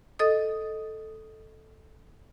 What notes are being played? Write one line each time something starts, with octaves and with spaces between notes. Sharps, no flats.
A4 D#5 D#6